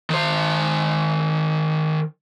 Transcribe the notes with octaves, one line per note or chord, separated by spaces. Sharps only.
D#3 C5